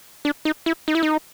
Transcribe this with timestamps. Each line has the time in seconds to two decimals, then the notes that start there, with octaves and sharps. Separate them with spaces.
0.25 D4
0.45 D#4
0.66 E4
0.88 D#4
0.95 E4
1.03 D#4